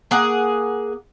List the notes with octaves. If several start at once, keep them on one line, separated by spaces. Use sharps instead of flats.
A#3 G#4 F#5